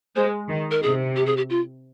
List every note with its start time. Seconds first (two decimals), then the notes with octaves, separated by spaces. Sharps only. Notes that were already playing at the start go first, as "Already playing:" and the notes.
0.16 G#3 C5
0.49 D#3
0.71 A#4
0.82 C3 G#4
1.16 G4
1.26 G#4
1.37 G4
1.50 F4